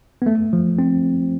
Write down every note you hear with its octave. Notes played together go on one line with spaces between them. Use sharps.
B3
A3
F3
C4